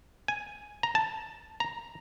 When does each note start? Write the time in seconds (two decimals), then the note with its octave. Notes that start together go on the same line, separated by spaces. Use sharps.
0.28 G#5
0.83 A#5
0.95 A5
1.60 A#5